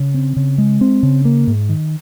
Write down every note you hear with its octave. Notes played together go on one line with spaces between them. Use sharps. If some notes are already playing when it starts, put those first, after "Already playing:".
Already playing: C#3
C4
C#3
G#3
C4
C#3
A#3
G#2
D#3